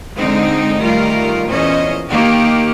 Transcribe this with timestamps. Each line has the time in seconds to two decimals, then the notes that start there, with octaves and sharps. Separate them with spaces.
0.15 D3 G#3 C4 D#4
0.78 D#3 G3 A3 F4 A#4
1.48 E2 A#2 C#4 C5 D#5
2.08 D#3 A#3 G4